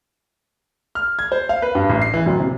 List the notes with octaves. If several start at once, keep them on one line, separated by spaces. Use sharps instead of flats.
F6
G#6
C5
F5
B4
G2
A1
C7
E3
D1
C3